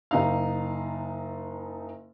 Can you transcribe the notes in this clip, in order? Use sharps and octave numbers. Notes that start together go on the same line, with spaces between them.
F#1 D#4 F5